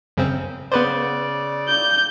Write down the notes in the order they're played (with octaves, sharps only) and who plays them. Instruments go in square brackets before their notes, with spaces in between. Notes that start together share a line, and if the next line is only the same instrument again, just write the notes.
[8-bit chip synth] F#2 C#3 C4
[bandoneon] C#3 D5 [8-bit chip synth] B3 B4 C5
[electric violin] G6